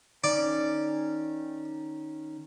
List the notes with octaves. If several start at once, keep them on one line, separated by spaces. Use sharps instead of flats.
D#3 C#4 D5